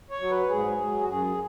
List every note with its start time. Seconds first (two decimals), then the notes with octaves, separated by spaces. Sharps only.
0.10 C#5
0.20 F#3
0.31 B4
0.49 G#2 G#4
0.79 F#3
1.01 F#4
1.08 F#2 G#4